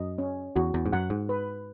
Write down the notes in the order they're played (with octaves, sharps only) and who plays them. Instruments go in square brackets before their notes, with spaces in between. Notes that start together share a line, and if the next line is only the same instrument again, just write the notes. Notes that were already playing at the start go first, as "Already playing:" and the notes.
Already playing: [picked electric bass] F#2 [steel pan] D#5
[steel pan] C#4
[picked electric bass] E2 [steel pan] F#4
[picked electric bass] E2
G#2
[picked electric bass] F#2 [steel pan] F#5
[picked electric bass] G#2
[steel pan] B4